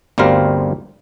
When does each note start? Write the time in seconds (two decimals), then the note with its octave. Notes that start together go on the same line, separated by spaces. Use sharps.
0.18 G1 D2 G3 C4 A#4 F5